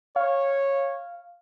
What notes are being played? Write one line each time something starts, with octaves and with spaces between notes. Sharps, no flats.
C#5 F5